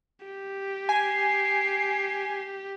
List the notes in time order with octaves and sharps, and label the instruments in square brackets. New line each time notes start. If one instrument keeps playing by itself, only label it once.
[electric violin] G4
[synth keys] G#5 [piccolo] C7